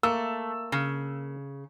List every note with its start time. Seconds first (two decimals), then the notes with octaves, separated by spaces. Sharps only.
0.03 A3 A#3 E6
0.72 C#3